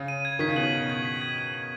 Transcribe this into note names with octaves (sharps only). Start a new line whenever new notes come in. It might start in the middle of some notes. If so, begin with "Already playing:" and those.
Already playing: C#3
D#7
G#6
D#3 B6
C#3
B2 F#7
D#7
G#6
B6
G#6
F#7
G#6